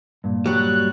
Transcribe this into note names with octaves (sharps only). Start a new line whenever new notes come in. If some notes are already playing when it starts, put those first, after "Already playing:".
G2 A#2
F#3 G3 F#6